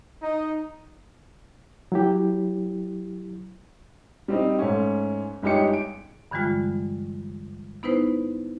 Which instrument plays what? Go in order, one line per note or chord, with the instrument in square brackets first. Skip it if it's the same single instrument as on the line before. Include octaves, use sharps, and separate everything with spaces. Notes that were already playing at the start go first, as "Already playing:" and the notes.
[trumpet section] D#4
[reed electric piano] F#3 E4 G4
[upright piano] G3 C4 D#4
G#2 A3 C#4
G1 G#3 D#4 G4 C#5 C#7
D7
[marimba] G2 D3 E3 G3 G#3 F4
B3 D#4 E4 B4 C5